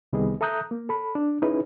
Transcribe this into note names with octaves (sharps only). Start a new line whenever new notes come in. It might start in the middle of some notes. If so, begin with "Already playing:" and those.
C2 D#3 G3 B3 G#4 D#5
A4 E5 A#5 D#6 F#6 G6
A#3
A4 B5
D4
C#4 D#4 E4 G#4 B4